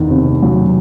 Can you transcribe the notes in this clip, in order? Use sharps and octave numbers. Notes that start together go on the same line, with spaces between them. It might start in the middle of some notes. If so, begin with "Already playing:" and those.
Already playing: E2 D#3
C3
F#3